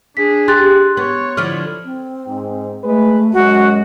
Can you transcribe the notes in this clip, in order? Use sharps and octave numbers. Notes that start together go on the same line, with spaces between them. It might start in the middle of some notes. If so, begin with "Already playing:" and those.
D4 G#4 B6
G4 C6 F#6 A6
B3 C#5
D3 F3 E4 F6
C4
G#2
G#3 A3 B4
F#2 G#3 F#4